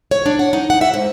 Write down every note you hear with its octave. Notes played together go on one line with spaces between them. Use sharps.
C#5
D4
F#5
D#4
F#5
E5
G#2